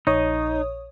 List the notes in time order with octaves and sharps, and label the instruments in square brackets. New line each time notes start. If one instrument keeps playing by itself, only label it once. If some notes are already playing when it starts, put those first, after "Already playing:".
[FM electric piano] A#1 C#5 D#6 [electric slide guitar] D#4